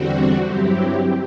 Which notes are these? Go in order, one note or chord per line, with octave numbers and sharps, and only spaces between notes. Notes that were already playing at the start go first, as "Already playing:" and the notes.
Already playing: E2 D3 G3 C4 F#4
G2 F#3 C4 E4 G4